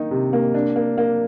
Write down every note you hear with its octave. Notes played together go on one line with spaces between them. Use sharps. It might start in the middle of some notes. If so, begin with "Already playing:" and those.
Already playing: D#3 A#3 D#4
C3
A#3
D4
A#3
A#3